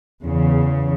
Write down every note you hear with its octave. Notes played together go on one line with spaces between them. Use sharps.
E2 C#3